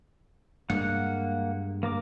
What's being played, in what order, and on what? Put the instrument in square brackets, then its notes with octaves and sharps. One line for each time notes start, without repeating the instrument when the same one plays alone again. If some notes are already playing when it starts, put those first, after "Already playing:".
[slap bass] G2 G#3 [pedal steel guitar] A#3 F#5
[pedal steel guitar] A#3 A#4 D6